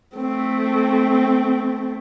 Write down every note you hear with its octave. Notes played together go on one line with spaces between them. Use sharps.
A3 C4